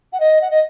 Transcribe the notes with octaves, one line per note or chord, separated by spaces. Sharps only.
F#5
D#5
F#5
D#5